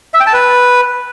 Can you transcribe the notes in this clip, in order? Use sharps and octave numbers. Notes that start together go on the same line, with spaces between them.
E5
G5
A5
B4